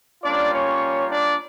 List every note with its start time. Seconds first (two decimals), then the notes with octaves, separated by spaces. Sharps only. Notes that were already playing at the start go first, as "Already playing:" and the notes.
0.24 G3 A#3 C#4 D4 F4 D5
0.52 C#4 C#5
1.08 D4 D5